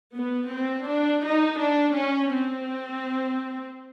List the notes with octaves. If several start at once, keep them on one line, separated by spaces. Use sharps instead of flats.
B3
C4
D4
D#4
D4
C#4
C4